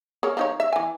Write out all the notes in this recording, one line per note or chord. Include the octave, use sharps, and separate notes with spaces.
G#4 A#4 C#5
F3 D#4 C#5
E5
E3 G#5